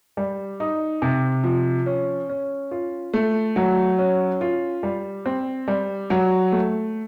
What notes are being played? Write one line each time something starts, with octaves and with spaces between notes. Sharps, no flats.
G3
D#4
C3
F3
C#4
C#4
F4
A3
F#3
C#4
F4
G3
C4
G3
F#3
A3